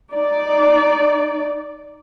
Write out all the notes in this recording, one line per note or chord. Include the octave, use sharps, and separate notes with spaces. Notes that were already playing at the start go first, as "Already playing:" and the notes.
D#4 D5